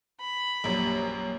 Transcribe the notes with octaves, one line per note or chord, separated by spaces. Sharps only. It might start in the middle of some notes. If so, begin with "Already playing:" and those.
B5
A#1 F#2 G3